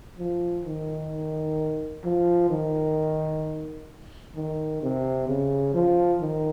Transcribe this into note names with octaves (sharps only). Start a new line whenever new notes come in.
F3
D#3
F3
D#3
D#3
C3
C#3
F3
D#3